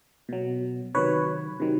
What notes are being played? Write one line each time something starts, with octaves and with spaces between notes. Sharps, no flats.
B2 F#3
C3 D#3 F#3 B4 C#5
C3 D#3 F#3